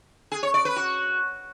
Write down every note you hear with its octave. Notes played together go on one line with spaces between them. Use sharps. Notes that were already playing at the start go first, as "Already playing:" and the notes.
G#4
C#5
D5
B4
F#4